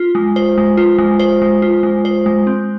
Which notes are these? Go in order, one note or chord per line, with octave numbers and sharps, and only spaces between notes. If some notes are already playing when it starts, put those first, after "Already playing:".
Already playing: F4
G#3
C5
G#3
F4
G#3
C5
G#3
F4
G#3
C5
G#3
C4